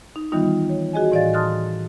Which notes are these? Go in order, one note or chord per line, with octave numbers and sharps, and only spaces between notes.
D#4
D#3 E3 G3 B3 D#4 F4
C#5
F#4 G#4 D#5 G#5
A2 E3 D5 D#5 F5 A6
A5 C6 D#6 F6 F#6 A6